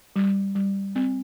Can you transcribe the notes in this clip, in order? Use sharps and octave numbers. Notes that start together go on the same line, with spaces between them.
G3
G3
C4